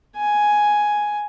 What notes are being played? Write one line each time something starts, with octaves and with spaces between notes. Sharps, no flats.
G#5